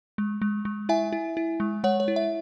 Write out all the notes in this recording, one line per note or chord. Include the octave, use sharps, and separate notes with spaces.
G#3
G#3
G#3
E4 E5 G#5
E4
E4
G#3
G#3 C#5 F#5
C#5
E4
E5